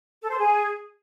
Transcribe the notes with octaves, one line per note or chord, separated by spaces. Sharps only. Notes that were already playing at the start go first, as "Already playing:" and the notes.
A4
C5
G#4